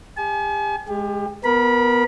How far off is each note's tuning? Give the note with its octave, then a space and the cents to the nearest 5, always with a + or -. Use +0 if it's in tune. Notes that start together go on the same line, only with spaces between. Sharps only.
G4 +40 G#5 +45
G#3 +0 G4 +30
B3 +0 A#4 +10 B5 -25